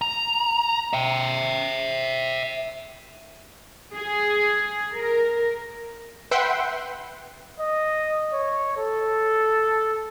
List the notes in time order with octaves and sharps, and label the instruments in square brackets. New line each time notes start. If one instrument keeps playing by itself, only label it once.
[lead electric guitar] A#5
E5 G5
[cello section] G#4
A#4
[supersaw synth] B4 E5 F#5 G5 C6
[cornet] D#5
C#5
A4